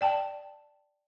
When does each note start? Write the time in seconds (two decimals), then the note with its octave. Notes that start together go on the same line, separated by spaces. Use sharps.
0.01 D5 G5 A5